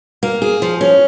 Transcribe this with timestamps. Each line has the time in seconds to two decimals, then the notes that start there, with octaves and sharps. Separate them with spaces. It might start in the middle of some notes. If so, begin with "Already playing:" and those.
0.23 A#3
0.42 G#4
0.62 F3
0.81 C#4